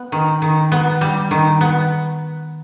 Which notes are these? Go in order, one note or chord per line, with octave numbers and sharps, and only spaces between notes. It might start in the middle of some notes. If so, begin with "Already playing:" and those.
Already playing: B3
D#3
D#3
B3
G3
D#3
B3